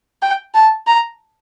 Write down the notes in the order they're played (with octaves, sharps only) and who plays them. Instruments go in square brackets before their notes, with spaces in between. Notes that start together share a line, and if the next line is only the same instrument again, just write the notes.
[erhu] G5
A5
A#5